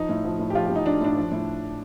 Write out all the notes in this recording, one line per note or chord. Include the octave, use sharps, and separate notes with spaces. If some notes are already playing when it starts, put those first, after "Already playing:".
Already playing: F3 D#4
A2
F3
A2
G4
F3 F4
G4
A2
D#4
F3 D4
A2 D4
F3
A2